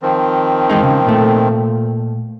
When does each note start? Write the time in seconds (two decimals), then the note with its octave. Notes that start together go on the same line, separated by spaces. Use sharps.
0.02 D#3 F3 C4
0.70 E2 G#3 D#4
0.83 C#3
1.06 A#2 A3